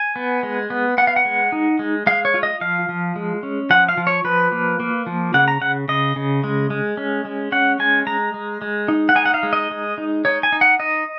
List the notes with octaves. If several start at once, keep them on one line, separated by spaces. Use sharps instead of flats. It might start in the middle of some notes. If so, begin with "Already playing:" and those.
Already playing: G#5
B3
G#3
B3
B3 F#5
F5
F#5
G#3
D#4
G#3
G#3 F5
C#5
F4
D#5
F3 F5
F3
G#3
C#4
F3 F#5
F5
F3
C#5
F3 B4
A#3
A#3
F3
C#3 F#5
A#5
C#3 F#5
C#3 D#5
C#3
G#3
G#3
C#4
G#3
C#4 F#5
G#3 G#5
G#3 A#5
G#3
G#3
D#4
F#5
D#4 G#5
F#5
F5
G#3
D#5
G#3
D#4
D#4 C#5
G#5
D#4
F#5
D#4 D#5